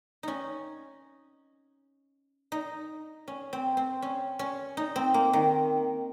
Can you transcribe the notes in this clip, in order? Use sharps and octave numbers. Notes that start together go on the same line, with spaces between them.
C#4 D#4
D#4
C#4
C4
C4
C#4
C#4
D#4
C4
A#3
D#3